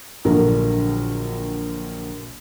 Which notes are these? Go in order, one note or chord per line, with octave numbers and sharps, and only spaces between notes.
A#1 D3 F#3 F#4 A#4